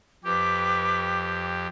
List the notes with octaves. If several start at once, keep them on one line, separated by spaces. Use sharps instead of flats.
F2 G4 B4 D6